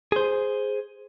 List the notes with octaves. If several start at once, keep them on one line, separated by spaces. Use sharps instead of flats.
G#4 C5